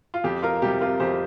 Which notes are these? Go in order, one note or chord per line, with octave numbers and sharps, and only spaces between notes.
F4
F2 G4
F4 A#4
C3 G3 G4
F4 A#4
F2 G4 C5